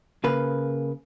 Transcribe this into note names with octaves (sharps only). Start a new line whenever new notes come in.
C#3 A#3 B4